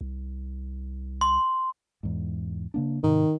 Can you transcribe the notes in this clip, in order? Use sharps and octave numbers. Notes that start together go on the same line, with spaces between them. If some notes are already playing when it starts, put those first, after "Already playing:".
C2
C6
E2 G#2
C#3 A#3 D4
G#2 C3 D#3